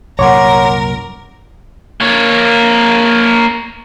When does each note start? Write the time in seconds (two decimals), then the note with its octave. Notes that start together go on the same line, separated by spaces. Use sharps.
0.19 C2 F#2 A#2 A#4 C#5 F#5 C6 D6
2.01 A#3 C#5